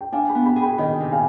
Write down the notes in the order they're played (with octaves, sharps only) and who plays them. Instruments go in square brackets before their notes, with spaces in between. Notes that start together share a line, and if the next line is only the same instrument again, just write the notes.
[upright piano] G5
[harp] D4 [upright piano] F5 G#5
[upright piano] G5 B5
[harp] B3
[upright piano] G5 B5
[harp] G#4
[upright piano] G5 B5
[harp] D#3 [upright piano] D#5 G5
[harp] C3
[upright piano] F5 G#5